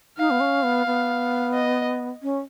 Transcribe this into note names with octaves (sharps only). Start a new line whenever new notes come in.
D#4 F5
B3
C#4
B3
B3
D#5
C#4